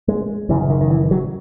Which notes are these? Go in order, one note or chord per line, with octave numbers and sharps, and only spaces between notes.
G#3
F#1 F#2 C#3 E3
D#3
D#3
E3
F#3